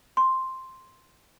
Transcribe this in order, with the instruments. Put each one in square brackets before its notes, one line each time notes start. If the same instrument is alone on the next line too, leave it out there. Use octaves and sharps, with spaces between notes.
[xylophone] C6